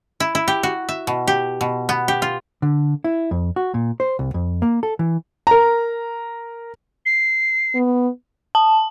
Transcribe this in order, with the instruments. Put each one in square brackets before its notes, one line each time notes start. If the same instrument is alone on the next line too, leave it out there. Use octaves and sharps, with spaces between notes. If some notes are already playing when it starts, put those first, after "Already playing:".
[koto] E4
E4
G4
F#4
E5
B2
G4
B2
B3
G4
F4
[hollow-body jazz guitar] D3
E4
F2
F#4
A#2
C5
C2
F2
A#3
A4
E3
[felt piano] A#4 A#5
[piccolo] C7
[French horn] B3
[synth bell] A5